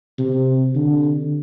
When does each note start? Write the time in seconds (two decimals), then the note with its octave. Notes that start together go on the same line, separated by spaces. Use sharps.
0.18 C3
0.75 D3